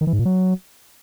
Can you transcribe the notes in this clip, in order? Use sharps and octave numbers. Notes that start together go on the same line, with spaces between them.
D#3
E3
G#2
A#2
F#3